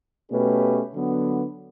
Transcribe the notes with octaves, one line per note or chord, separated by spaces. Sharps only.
B2 A3 C#4 G4 B4
D3 F#3 B3